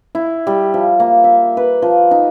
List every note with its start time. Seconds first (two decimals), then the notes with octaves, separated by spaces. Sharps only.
0.15 E4
0.47 G3
0.74 F3
1.00 A#3
1.24 E5
1.57 B4
1.82 F3
2.11 D#4